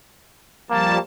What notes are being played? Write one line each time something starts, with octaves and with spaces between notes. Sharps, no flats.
F3 G3 A#3 A5